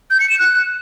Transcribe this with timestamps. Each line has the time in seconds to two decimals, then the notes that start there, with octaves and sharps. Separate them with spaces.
0.10 G6
0.20 C#7
0.29 E7
0.39 F#6